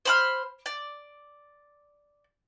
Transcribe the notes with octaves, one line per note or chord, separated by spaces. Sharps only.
C5 B5 F6
D5